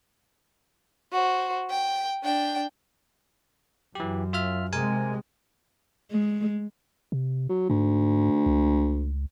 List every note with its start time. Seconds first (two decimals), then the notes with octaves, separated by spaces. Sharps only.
1.13 F#4 C5
1.70 G5
2.24 D4 G5
3.95 F#2 E3 G4
4.33 F4 E5 F6
4.73 C3 G#3 A#4 G#5
6.11 G#3
7.12 C3
7.49 F#3
7.70 D2 G#2
8.46 C#2